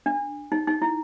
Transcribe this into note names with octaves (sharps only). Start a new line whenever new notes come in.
D4
D#4
D#4
E4